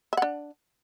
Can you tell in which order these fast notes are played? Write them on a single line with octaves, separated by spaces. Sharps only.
E5 F#5 D4